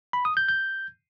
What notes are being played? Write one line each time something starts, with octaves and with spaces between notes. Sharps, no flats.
B5
D#6
G6
G6